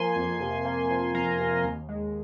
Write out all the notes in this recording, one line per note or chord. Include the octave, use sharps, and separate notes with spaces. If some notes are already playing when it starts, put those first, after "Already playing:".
Already playing: F3 A#3 G#5 C6
F2
C3
A#3
F3
F2 F5 A#5
C3
D#2
G#3